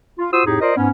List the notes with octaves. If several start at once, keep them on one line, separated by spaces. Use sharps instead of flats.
F4
F4 F#4 C5 D#6 E6
F2 A2 D#4 G4 G#4
F4 A#4 C5 D5 D#5
G#2 B3 C#4